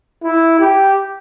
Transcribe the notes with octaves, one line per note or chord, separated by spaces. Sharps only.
E4
G4